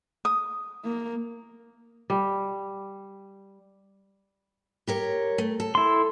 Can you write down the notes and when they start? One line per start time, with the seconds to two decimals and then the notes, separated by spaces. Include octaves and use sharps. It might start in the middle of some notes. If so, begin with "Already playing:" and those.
0.25 D#6
0.85 A#3
2.10 G3
4.87 G4 A#4 C#5
5.38 A3
5.60 A4
5.75 E4 C6